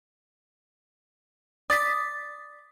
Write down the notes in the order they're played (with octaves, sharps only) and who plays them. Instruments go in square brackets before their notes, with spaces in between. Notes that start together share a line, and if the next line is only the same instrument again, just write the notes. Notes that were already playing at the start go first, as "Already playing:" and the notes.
[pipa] D5 [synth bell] D#6 A6 B6